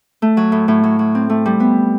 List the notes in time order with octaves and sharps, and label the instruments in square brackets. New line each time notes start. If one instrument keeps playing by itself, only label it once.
[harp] A3
F#3
A2
A2
F#3
F#3
C4
A3
G3
B3